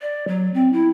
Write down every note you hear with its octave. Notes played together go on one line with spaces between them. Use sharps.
D5
F#3
C4
E4